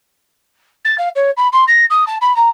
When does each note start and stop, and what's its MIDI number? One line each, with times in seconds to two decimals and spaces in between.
0.84 0.95 93
0.98 1.09 77
1.15 1.30 73
1.37 1.48 83
1.52 1.64 84
1.67 1.85 94
1.90 2.04 87
2.07 2.16 81
2.21 2.35 83
2.36 2.49 82